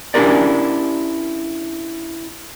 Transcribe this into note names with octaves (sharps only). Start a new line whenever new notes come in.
C#4 D4 E4 G4 A#4 D5